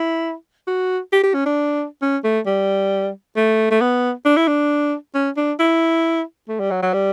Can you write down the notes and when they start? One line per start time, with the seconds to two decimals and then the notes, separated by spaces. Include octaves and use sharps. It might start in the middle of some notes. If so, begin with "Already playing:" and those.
Already playing: E4
0.67 F#4
1.13 G4
1.23 G4
1.34 C#4
1.46 D4
2.02 C#4
2.24 A3
2.46 G3
3.36 A3
3.71 A3
3.80 B3
4.25 D4
4.37 E4
4.48 D4
5.15 C#4
5.37 D4
5.59 E4
6.49 A3
6.60 G3
6.71 F#3
6.83 F#3
6.93 G3